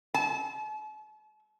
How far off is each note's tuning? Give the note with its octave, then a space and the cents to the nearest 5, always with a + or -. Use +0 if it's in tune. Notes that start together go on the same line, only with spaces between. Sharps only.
A5 -45